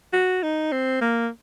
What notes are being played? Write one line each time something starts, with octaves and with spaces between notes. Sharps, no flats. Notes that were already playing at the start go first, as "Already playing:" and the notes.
F#4
D#4
C4
A#3